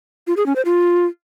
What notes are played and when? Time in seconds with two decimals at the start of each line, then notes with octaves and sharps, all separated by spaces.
0.27 F4
0.37 G#4
0.46 C#4
0.56 C5
0.65 F4